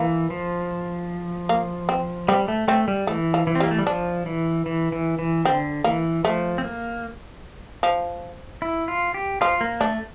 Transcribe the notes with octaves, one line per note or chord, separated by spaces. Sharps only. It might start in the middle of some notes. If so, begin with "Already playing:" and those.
Already playing: E3 A#3
F3
A#3
C4
G3 C4
A3
A3 C4
G3
E3 A3
F3
E3
C4
G3
A#3
A3
G3
F3 D4
E3
E3
E3
E3
D3 C4
E3 A#3
F3 A3
C4
A#3
F3
E4
F4
G4
F3 F4
A#3
A3 D4